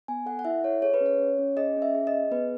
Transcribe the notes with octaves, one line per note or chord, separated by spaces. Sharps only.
B3 G#5
A4 F#5
F#5
E4 E5
A4 C#5
G#4 C#5
B4
C#4
C#5
C#4
C#4
G#4 D#5
C#4
E5
G#4
D#5
G#4
B3 B4